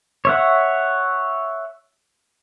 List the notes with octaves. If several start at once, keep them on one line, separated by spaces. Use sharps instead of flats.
C#5 E5 F#5